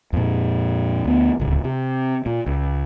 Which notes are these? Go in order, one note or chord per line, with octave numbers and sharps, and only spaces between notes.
F2 A#2
D2 B3
D1 C#2
C3
A#2
C#2